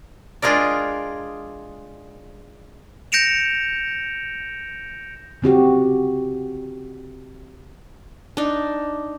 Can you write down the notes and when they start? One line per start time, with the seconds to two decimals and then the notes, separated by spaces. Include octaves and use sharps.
0.42 G#3 D4 F4 G#4 A#4 D5
3.12 G6 A#6 C#7 D7 E7 F7
5.42 C#3 C4 F#4 G4
8.37 D4 D#4